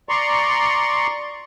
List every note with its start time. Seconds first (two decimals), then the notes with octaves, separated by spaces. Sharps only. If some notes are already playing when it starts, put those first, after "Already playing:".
0.09 D5 A#5 C6 C#6